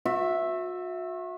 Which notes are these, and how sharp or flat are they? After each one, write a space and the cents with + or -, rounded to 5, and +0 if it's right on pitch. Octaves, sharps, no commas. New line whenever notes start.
F#4 -40 E5 +0